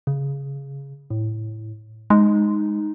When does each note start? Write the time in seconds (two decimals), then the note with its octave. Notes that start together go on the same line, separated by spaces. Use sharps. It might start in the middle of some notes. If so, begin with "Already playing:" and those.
0.07 C#3
1.10 A2
2.10 G#3 D#4